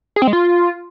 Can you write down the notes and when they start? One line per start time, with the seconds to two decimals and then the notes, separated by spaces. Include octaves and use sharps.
0.16 G#4
0.22 C4
0.27 G#3
0.33 F4